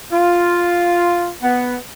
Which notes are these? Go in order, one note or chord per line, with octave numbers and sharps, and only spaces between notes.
F4
B3